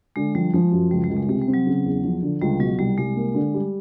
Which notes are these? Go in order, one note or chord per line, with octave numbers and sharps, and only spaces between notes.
D3 G#3
F3 G3
F3 G#3
F#2
C#2 G3
G3
C#2
G#3
C3 G#3
G3
C4
F#3
C#3
E2
F3
D3
C#2 G3
B2 F#3
C2 G3
C2 G#3
A#3
D3
G3